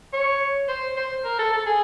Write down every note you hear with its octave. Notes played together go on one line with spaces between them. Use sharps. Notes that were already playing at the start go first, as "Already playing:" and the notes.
C#5
C5
C5
A#4
A4
A4
G#4